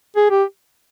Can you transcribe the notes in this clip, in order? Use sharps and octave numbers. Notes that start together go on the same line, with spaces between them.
G#4
G4